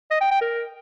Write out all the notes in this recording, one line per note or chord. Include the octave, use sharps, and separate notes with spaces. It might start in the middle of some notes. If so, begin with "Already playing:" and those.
D#5
G5
G5
A#4